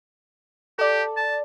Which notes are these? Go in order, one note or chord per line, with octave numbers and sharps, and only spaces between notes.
G4 A4 D5
A5